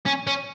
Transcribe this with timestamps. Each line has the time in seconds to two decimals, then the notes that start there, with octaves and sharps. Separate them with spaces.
0.06 C#4
0.27 C#4